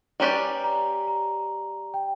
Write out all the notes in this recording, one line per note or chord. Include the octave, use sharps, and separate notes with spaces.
G3 C#4 G4 B4 D5 A#5
A#5
A#5
G5